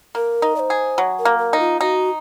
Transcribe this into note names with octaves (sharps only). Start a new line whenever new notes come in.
A#3 A#4
D#4
D5
C5
G#4
F#3
A#4
A#3
A#4
D#4
F4
D#4 F#4